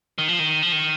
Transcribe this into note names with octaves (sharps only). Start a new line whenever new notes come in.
D#3
F3
D#3
F3
D#3